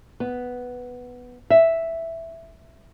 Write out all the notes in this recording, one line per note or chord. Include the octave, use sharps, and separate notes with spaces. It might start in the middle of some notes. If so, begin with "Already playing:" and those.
B3
E5